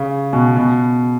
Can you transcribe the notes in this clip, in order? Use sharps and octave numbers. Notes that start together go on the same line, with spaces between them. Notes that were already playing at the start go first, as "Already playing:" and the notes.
Already playing: C#3
B2
B2